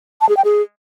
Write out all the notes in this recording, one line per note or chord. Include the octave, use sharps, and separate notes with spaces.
A5
G#4
G5
G#4